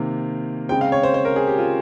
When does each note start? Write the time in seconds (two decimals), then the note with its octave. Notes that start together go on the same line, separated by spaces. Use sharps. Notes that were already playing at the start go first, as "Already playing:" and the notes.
Already playing: C3 D#3 A#3
0.69 C#3 G#3 C4 G5
0.81 F5
0.92 C#5
1.03 C5
1.14 C5
1.25 A#4
1.36 G#4
1.47 G4
1.58 F4